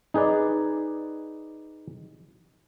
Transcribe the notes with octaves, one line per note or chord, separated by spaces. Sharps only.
D#4 G#4 B4 D5